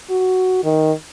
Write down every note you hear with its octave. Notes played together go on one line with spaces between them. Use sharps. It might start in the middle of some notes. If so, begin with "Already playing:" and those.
F#4
D#3